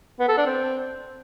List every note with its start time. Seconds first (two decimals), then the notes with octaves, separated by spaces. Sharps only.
0.20 B3
0.28 A4
0.37 D4
0.46 C4